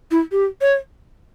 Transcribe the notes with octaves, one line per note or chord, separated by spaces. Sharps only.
E4
G4
C#5